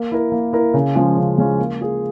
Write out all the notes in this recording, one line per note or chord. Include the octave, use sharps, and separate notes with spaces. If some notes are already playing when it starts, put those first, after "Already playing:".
Already playing: A#3
E4 A#4
A#3
E4 A#4
C#3
F3 G#3 C#4
C#3
F3 G#3 C#4
A#3
F4 G#4